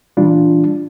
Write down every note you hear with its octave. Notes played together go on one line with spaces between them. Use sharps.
A#2 E3 G3 D4 F4